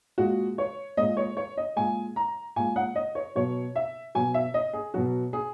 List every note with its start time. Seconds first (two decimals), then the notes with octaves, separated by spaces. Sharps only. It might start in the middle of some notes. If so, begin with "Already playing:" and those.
0.18 A#2 G#3 F#4
0.58 C#5
0.97 A#2 G#3 D#5
1.17 C#5
1.37 C#5
1.57 D#5
1.76 A#2 G#3 G#5
2.16 A#5
2.56 A#2 G#3 G#5
2.76 F#5
2.96 D#5
3.15 C#5
3.35 B2 F#3 C#5
3.76 E5
4.15 B2 F#3 G#5
4.34 E5
4.54 D#5
4.73 G#4
4.94 B2 F#3 F#4
5.33 G#4